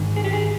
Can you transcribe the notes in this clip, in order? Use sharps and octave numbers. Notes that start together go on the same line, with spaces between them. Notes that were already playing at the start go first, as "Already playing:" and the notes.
Already playing: G#2 D#3
G#4
G4
G#4